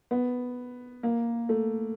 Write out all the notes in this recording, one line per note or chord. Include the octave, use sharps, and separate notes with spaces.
B3
A#3
A3